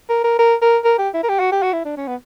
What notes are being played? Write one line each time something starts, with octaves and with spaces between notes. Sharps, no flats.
A#4
A#4
A#4
A#4
A#4
G4
E4
A#4
G4
F#4
G4
F#4
E4
D4
C#4
B3